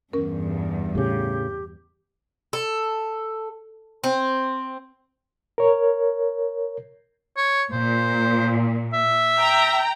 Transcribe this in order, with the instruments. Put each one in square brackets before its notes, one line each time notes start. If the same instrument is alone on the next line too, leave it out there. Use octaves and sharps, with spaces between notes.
[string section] E2 G2 [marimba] C#4 A#4
[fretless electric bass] A2 C#3 [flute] G4
[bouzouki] A4
C4
[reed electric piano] A#4 C#5
[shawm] C#5
[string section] A#2 [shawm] C5
[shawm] E5
[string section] G5 A#5